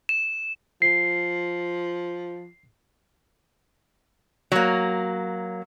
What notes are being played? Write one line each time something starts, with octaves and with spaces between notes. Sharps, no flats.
E7
F3 C7
F#3 A#3